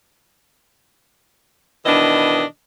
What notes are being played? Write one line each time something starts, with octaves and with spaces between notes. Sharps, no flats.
B2 D#3 E3 D4 D#5